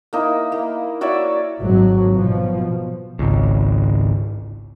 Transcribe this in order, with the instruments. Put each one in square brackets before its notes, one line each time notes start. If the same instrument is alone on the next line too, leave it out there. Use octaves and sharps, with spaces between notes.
[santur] A#3 D#4 E4
A#3
F#4 C#5 D5 E5
[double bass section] G#1 F#3
B2 F3
[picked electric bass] G#1 C#2